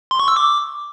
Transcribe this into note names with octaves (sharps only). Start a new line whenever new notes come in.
C6
C#6
E6
D6